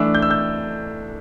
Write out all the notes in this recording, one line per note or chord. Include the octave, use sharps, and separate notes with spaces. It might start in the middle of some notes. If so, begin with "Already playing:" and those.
Already playing: E3 A3 D4 E6
G6
E6
G6